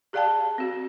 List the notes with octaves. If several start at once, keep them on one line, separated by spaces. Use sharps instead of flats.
G4 G#4 D5 F5 G5 A5
C4 F#4